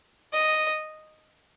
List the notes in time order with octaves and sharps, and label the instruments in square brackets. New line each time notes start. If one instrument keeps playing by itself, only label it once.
[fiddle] D#5